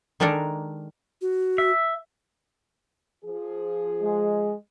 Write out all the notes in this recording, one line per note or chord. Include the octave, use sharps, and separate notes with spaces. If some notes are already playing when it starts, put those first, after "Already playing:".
D#3 G#3 D4 A4 A#4 D5
F#4
E5
F3 G#4
G#3